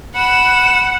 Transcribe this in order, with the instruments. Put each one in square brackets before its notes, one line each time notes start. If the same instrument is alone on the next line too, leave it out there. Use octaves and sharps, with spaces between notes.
[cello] F#5 [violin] B5 E7